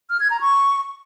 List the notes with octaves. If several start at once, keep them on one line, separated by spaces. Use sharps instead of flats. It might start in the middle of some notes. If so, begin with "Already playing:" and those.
F6
G#6
A#5
C#6